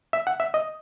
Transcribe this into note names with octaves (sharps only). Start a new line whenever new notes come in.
E5
F#5
E5
D#5